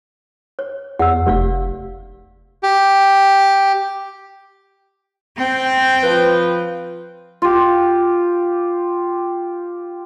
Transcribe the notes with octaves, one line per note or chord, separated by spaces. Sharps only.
C#5
E2 F#5 E6
F1 G4 D5 F5
G4
C4 G5
F3 B4
F4 G4